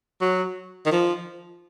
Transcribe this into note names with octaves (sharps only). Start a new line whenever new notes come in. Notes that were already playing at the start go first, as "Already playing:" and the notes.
F#3
D#3
F3